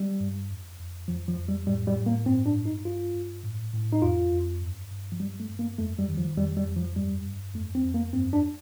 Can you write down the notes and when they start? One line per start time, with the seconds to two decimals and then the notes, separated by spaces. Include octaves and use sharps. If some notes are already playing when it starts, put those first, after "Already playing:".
Already playing: G3
0.20 G2
0.50 F2
0.79 F2
1.08 F2 F3
1.28 F3
1.38 F2
1.48 G3
1.67 A2 G3
1.87 G3
1.96 A2
2.06 A#3
2.26 G2 C4
2.46 D4
2.56 G2
2.66 D#4
2.85 G2 F4
3.15 G2
3.44 A2
3.73 A2
3.93 D#4
4.02 F2 F4
4.32 F2
4.61 G2
4.91 G2
5.12 F3
5.20 G2 G3
5.40 A3
5.49 G2
5.59 A#3
5.78 F2 A3
5.99 G3
6.08 D#3
6.18 F3
6.37 F2 G3
6.57 G3
6.66 F2
6.76 F3
6.96 G2 G3
7.26 G2
7.54 F2 A3
7.75 C4
7.84 F2
7.94 A#3
8.13 G2 C4
8.33 D4